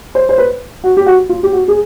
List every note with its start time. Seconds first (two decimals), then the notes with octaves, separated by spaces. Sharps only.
0.15 C5
0.29 C5
0.38 B4
0.84 F#4
0.97 G4
1.06 F#4
1.29 F4
1.43 G4
1.53 F#4
1.68 G#4